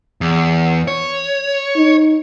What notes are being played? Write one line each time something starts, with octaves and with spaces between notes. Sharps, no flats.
E2
C#5
D#4